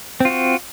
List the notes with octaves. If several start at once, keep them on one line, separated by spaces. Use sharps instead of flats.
C4 F4 F#4